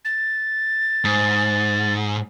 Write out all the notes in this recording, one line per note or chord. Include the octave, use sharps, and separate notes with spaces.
A6
G#2